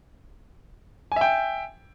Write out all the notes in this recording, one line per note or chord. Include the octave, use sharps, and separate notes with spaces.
E5 G5 G#5